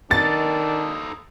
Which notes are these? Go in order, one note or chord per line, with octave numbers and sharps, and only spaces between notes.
D#3 D4 D#4 A4 A6